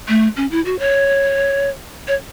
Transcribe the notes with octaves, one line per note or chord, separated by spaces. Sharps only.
A3
C#4
E4
F#4
C#5
C#5